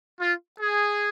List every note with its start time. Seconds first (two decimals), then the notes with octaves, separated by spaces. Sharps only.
0.21 F4
0.61 G#4